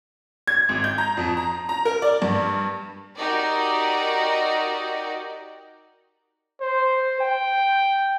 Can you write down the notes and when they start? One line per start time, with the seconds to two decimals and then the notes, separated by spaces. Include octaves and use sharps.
0.47 G#6
0.69 G#1
0.84 G6
0.98 A#5
1.17 F2
1.37 A#5
1.69 A#5
1.85 A#4
2.02 D5
2.22 G2
3.18 D#4 F#4 G4 A#4 D5
6.61 C5
7.21 G5